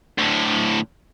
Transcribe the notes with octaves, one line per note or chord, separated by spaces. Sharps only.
D2 A2